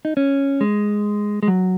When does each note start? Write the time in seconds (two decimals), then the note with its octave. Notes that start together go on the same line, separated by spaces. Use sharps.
0.05 D#4
0.17 C#4
0.61 G#3
1.43 G#3
1.48 F#3